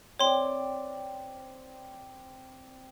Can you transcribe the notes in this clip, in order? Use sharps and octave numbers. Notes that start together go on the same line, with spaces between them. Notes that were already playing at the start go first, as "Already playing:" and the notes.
C4 C#5 D5 C6